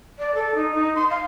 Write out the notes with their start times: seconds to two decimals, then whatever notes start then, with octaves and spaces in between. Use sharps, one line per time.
0.19 D5
0.35 A4
0.55 D#4
0.74 D#4
0.95 C6
1.10 F5